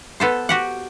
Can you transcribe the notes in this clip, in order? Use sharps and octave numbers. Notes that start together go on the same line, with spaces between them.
B3 A4 C5
F#4 G4 F#5